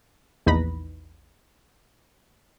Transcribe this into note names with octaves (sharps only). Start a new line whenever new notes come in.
A#1 E2 D#4 B4 B5 A#6